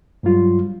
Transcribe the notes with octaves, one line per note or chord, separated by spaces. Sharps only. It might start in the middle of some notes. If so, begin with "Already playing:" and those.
G2 F#3 G3 F4